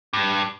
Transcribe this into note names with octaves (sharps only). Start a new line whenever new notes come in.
G2